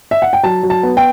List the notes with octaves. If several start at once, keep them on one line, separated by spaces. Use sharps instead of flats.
E5
F#5
G5
F#3 A5
F#3
A5
B3
G5